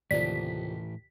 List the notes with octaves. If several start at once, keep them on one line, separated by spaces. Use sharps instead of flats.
D#2 A2 C3 E3 F3 A4 D5 B6